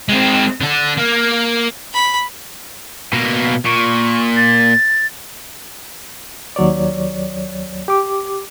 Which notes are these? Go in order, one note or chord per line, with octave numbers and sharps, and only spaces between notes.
G#3 C4
D3 D4
A#3
B5
B2 A#3
A#2 C#6
A6
D#2 F#3 C#5 D5
G4 D6